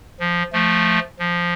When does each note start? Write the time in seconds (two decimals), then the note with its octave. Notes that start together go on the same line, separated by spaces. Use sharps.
0.20 F3
0.53 F3 A3
1.19 F3